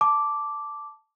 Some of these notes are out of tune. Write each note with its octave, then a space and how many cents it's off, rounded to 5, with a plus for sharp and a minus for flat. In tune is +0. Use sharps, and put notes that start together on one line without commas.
A5 +0 D6 -5